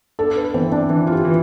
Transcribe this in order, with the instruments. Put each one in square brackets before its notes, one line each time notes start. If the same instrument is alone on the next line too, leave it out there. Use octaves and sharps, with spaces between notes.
[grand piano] D4 [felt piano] A4
[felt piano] B4
[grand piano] E3 [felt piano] C4
[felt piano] D4
[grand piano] E3
[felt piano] F4
G4
[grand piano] E3